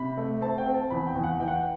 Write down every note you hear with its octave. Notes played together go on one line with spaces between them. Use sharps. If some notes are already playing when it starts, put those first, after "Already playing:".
Already playing: C3 B5
A3
C4 A5
G5
C4
A5
E2 B5
G5
E2
F#5
E3 G5
F#5
G5